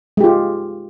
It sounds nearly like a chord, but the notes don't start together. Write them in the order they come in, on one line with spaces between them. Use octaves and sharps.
G#3 G4 F4